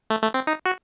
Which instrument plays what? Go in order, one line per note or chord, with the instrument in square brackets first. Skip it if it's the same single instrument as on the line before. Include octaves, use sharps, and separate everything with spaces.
[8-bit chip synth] A3
A3
C4
D#4
F#4